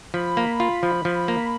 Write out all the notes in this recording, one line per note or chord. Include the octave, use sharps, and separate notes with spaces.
F3 B5
A#3
F4
F3
F3
A#3